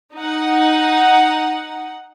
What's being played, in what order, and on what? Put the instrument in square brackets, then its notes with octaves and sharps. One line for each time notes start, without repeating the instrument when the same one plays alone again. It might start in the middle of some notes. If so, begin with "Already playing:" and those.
[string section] D#4 F#5